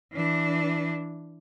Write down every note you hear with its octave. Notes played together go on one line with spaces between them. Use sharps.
E3 D4